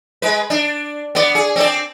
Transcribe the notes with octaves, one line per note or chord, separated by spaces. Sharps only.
G#3 B4
D4
B3 D5
G#4
C4 D4 D5